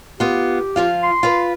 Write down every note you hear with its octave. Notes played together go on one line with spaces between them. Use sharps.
B3 F4 G4
F3 F4 F5
C6
F4 B4